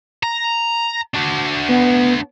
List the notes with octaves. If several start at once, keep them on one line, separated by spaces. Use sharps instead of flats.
A#5
D4 F#4
B3